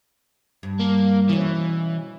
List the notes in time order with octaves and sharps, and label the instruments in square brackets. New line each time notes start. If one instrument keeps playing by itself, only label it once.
[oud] G2
[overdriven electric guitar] A#3
[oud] B2 C#4 [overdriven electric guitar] E3